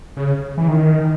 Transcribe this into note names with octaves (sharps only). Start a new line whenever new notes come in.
C#3
E3
D#3